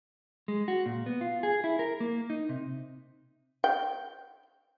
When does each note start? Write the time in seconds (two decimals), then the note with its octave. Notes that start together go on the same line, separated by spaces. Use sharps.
0.48 G#3
0.68 F#4
0.86 A#2
1.06 B3
1.21 F4
1.43 G#4
1.64 E4
1.79 A#4
2.00 A#3
2.30 D#4
2.49 C3
3.64 G5